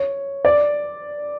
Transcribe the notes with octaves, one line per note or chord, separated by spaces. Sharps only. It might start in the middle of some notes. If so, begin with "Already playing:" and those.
Already playing: C#5
D5